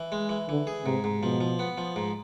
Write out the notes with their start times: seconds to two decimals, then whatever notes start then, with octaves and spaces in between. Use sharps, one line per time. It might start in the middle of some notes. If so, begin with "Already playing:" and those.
Already playing: E3
0.12 G#3
0.29 E3
0.49 D3 E3
0.67 G#4
0.85 G#2 C3
1.04 G#2
1.22 B2 F3
1.41 F3
1.59 B3
1.78 F3
1.96 G#2